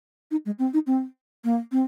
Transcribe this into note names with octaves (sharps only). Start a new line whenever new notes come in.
D#4
G#3
C4
D#4
C4
A#3
C4